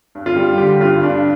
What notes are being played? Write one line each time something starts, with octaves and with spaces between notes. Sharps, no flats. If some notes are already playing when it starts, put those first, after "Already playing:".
G2
F4
G3
D3 G4
G2 F4
G2 D4